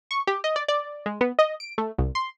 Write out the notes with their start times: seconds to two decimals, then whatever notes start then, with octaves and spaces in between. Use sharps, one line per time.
0.11 C#6
0.27 G4
0.44 D#5
0.56 D5
0.68 D5
1.06 G#3
1.21 B3
1.39 D#5
1.60 D7
1.78 A3
1.98 C2
2.15 C6